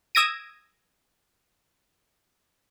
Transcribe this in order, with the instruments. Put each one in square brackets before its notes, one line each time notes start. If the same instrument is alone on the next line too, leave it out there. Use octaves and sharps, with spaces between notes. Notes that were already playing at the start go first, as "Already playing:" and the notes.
[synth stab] D#6 E6 G#6 A#6 D7 D#7